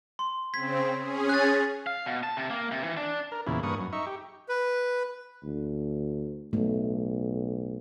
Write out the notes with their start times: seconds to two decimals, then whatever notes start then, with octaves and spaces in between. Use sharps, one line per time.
0.19 C6
0.54 C#3 C4 G#6 B6
0.97 C#4 G#4
1.29 F#6 A6
1.87 F5
2.06 B2
2.23 A5
2.37 C3
2.50 A#3
2.71 C3
2.84 E3
2.97 D4
3.32 A#4
3.47 E2 A#2 C#3 E4
3.63 G2 A#3 B4 C#6 D#6
3.78 F#2
3.93 D#4 E5 C#6
4.07 G4
4.49 B4
5.43 D2
6.53 B1 A3